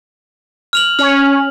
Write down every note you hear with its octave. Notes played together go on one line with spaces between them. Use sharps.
F6 F7 F#7
C#4 F6